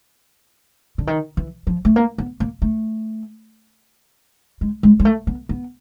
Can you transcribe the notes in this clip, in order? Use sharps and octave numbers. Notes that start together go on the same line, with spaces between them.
D3
D#3
E3
F3
A3
A#3
B3
A#3
A3
G#3
G#3
G#3
A3
B3
B3